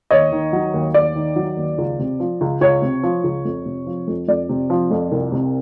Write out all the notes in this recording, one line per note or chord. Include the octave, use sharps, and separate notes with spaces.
D#2 C#5 D#5
D#3
F#3
D#2
D#2 D5
D#3
F#3
D#2
C#2
C3
F3
C#2
C#2 C#5
C3
F3
C#2
F2
C3
F3
F2
F2 D5
C3
F3
F2
C2
C3